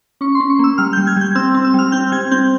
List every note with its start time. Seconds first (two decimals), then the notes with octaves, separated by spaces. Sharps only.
0.21 C#4 C#6
0.35 C6
0.40 C#4
0.50 C#6
0.59 A#3 E6
0.78 G3 F6
0.93 G6
0.97 G3
1.07 G#6
1.16 G3 G6
1.35 C4 E6
1.54 C4
1.64 E6
1.74 G3 F6
1.92 C4 G6
2.12 G3 G#6
2.31 C4 G6